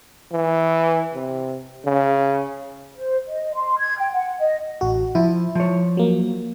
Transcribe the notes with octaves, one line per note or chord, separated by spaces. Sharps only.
E3
C3
C#3
C5
D#5
C6
G#6
G5
F#5
D#5
A1 F#4
F3 E4
F3 C#5
F#3 A#3